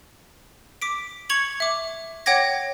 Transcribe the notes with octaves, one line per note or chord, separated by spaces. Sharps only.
D6 B6 D7
C#6 G#6 C#7 F7 F#7
E5 D6
C#5 F#5 G5 D6 G#6 A#6